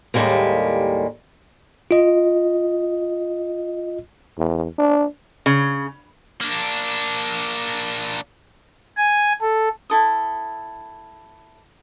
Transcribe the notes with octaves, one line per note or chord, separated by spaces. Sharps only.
D#2 A2 F3 G3 G#3 A#3
F4 D#5
E2
D4
C#3
A#3 D4
G#5
A4
E4 A4 D#6